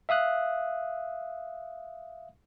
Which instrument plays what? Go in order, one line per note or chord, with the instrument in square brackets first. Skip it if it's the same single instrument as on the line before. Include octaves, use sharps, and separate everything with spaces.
[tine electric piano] E5 F5 D#6 F#6